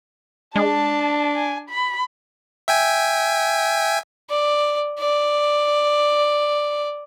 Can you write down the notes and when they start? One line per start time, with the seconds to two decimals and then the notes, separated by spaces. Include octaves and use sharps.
0.56 G#3 D4 A5
1.36 G#5
1.70 B5
2.68 E5 G5 G#5
4.30 D5
4.99 D5